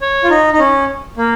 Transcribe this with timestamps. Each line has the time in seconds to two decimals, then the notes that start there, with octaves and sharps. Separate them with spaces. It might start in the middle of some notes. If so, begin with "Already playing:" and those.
0.02 C#5
0.24 F4
0.30 D#4
0.54 D#4
0.59 C#4
1.17 A#3